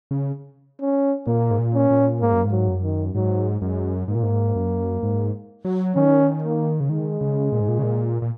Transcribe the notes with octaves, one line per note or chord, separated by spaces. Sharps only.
C#3
C#4
A#2 A#3
G#2
A#2
C#4
A#2
G#2 A#3
F#2
G#2
F#3
F#2
D#3
G#2 F#3
F#2 G#3
G#2 A#3
A#2
G#2
F#2
G#2
F#3
D#3 C#4
A#3
C#3
D#3 G#3
C#3
A#2
G#2
A#2
C#3
A#2
A#2